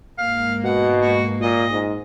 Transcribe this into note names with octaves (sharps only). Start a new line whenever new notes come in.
G#2 A#3 F5
B2 F#5
F#4
A#2 D#5
G#2